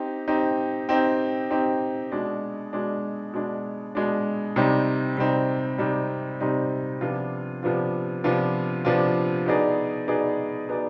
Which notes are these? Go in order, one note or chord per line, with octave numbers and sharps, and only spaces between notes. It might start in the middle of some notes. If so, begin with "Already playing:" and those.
Already playing: C4 D#4 G4
C4 D#4 G4
C4 D#4 G4
C4 D#4 G4
B2 G#3 D4
B2 G#3 D4
B2 G#3 D4
B2 G#3 D4
C3 G3 C4 D#4
C3 G3 C4 D#4
C3 G3 C4 D#4
C3 G3 C4 D#4
C3 F3 B3 D4 F4
C3 F3 B3 D4 F4
C3 F3 B3 D4 F4
C3 F3 B3 D4 F4
B2 B3 D#4 G#4 D5
B2 B3 D#4 G#4 D5
B2 B3 D#4 G#4 D5